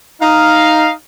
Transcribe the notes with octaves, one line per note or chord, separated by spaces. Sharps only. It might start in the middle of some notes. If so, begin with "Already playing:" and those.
D#4 F5